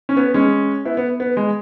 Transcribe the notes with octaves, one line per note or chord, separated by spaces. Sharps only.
C#4
B3
G#3 C#4
B3 E4
B3
B3
G#3